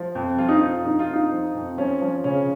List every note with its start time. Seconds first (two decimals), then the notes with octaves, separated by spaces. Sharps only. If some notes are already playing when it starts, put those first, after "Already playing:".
Already playing: F3
0.15 F2
0.38 F3 F4
0.49 D#4
0.57 F4
0.62 F2
0.85 F2 D#4
0.99 F4
1.08 F2 D#4
1.31 F3
1.55 F2
1.78 F3 C#4
2.02 F3
2.24 C#3 C#4